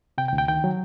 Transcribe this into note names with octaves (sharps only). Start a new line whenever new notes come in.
C3 G5
G5
D2
G5
D#3 G5
F#3